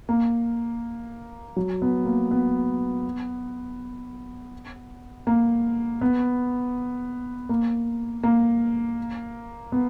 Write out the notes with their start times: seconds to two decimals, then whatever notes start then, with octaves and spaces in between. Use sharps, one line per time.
0.09 A#3
1.57 F#3
1.82 B3
2.05 A#3
2.31 B3
5.27 A#3
6.01 B3
7.49 A#3
8.23 A#3
9.72 B3